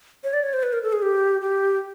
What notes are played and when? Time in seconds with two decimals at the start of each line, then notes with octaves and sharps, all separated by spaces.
0.24 C#5
0.33 D5
0.43 C#5
0.53 C5
0.63 B4
0.73 A#4
0.83 A4
0.93 G#4
1.02 G4
1.41 G4